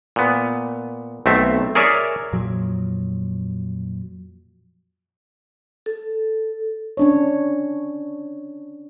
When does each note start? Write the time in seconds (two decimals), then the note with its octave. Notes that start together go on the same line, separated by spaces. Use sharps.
0.16 A#2 B3
1.26 B1 A3 C4 E5
1.75 G#4 A#4 C#5 D5 E5
2.33 F2 A#2 F3 F#3
5.86 A4
6.97 C#4 D4 C#5